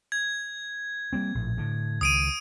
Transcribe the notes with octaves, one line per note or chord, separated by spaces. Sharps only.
G#6
G3 A#3 C4
A#1 A2
A2 D3
C#2 D#3 D#6 D7 D#7